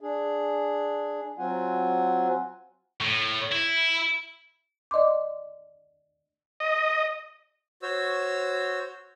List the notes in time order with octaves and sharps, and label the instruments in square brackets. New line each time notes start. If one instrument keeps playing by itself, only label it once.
[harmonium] D4 G#4
F#3 C4 F4 F#5 G#5
[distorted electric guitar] A2
E4
[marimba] D5 D#5 C6 D6
[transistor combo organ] D#5
[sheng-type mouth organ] F#4 C5 C#5 E6